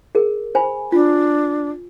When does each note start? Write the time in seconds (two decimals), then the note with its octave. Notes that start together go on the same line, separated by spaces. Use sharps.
0.15 G#4 A#4
0.55 C5 G#5 B5
0.92 D4 F4